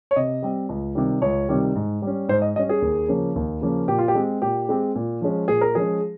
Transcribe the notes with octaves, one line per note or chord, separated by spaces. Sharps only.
C#5
C3 D#5
G3 C4
C#2
C3 D#3 G3
C#2 C#5
C3 D#3 G3
G#2
G3 C#4
G#2 C5
D#5
G3 C#4 D#5
G#4
D#2
C#3 F3 A#3 C#4
D#2
C#3 F3 A#3 C#4
A#2 G4
F4
G4
G#3 C4
A#2 G4
G#3 C4
A#2
F3 G#3 C#4
A#2 G#4
A#4
F3 G#3 C#4 G#4